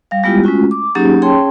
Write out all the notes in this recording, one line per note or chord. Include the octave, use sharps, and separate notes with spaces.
G3 F5
G3 G#3 B3 E4 F4 G4
G#3 A3 C#4 F4 F#4
D6
F#3 A#3 C#4 D#4 G4 G#4
C#4 G#4 C#5 G5 A5 C6